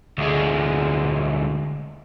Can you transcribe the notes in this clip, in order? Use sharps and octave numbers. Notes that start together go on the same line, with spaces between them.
D2 G#3